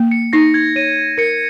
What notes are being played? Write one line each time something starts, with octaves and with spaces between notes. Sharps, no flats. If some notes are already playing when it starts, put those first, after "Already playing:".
Already playing: A#3
C#7
D#4 A#6
G#6
C#5 D#7
A#4 C#7